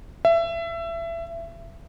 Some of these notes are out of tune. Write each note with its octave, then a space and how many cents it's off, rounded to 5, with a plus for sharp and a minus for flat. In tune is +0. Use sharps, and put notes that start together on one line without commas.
E5 +25